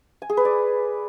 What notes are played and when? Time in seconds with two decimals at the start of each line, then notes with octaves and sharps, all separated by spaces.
0.22 G#5
0.29 G#4
0.37 B4
0.45 D5